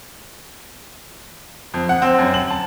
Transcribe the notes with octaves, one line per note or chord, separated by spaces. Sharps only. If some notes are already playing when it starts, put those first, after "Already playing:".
F2
F#5
C4
F#2
F#7
A5